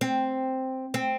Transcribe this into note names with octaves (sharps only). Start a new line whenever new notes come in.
C4
C4